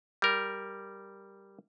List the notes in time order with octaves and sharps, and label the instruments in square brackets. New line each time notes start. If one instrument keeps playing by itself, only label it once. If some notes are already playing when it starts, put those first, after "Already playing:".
[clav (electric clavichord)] G3 A#4